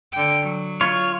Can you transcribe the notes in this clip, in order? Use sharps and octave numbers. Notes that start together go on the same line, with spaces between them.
D3 G5
F#3
F4 C#5